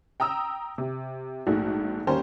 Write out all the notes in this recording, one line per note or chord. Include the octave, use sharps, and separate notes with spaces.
G5 A#5 D#6 E6
C3
A#1 G#2 G#3 A3 F#4
D#2 G3 C#4 A#4 C5 G5